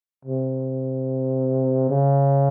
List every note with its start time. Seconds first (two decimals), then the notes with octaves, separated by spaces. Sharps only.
0.25 C3
1.90 C#3